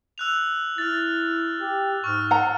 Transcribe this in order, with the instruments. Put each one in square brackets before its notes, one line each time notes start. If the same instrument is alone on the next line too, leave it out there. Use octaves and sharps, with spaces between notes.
[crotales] E6 F#6 F7
[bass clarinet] E4 [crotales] F6 A6
[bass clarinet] G4
[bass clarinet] G#2 [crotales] C#6 F6
[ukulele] F#5 A#5